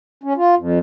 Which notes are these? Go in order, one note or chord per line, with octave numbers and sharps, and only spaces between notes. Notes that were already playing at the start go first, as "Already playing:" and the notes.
C#4
F4
F2